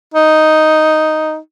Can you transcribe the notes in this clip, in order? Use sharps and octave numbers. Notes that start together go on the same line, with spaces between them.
D#4